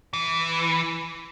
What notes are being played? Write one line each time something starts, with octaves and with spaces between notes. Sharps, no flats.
E3